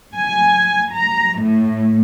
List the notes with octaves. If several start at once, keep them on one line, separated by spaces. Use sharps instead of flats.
G#5
A#5
A2